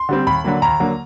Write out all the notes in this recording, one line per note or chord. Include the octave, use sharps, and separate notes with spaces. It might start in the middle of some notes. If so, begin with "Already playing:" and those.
Already playing: C6
D3 G3 C4
D#2 B5
D3 F#3 A#3
D#2 A#5
D3 F#3 A#3